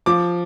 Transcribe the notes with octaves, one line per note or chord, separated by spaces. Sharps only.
F3 D6